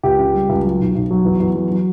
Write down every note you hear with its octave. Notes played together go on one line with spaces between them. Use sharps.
C#2 G4
C#3
G3
C#2
F#3
B1
B1
F#3
E2
E2
F#3
F#3